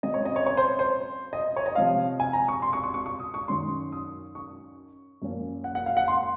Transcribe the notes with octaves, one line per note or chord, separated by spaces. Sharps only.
C#3 F#3 C4 D#5
C#5
D#5
C#5
C#5
C5
C5
D#5
C#5
D#5
C3 F3 C4 F5
G#5
A#5
C#6
C6
C#6
C#6
C#6
C#6
D#6
C#6
F#2 D#3 F#3 C#4 C6
D#6
C#6
F#2 F3 A#3 C#4
F#5
F#5
F5
F#5
C6